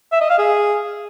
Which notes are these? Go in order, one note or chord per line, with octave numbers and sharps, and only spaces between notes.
E5
D#5
F5
G#4